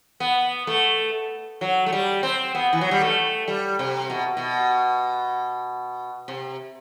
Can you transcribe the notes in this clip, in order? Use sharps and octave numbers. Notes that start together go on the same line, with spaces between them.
B3
A3
F#3
A3
G3
C4
B3
E3
F#3
G3
A3
G3
C3
B2
B2
C3